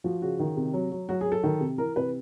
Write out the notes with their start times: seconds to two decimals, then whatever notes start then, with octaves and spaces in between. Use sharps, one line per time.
0.04 F3 F#4
0.22 C#3 F#4
0.39 D#3
0.57 C3
0.74 F#3
0.92 F#3
1.09 F#3 F#4
1.21 G#4
1.26 F#3
1.32 A4
1.43 D#3
1.61 C3
1.78 E3 A#4
1.96 C3 B4